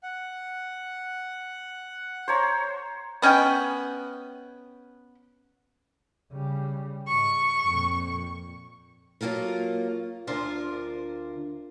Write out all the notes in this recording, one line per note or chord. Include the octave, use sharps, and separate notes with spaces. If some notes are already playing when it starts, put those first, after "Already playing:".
F#5
C5 C#5 A#5
B3 C#4 D#5 G5
C#3 G3
G#2 C#6
F2 A#2
F#3 A#3 F4 A4 A#4
D2 D4 F4 A#4 C5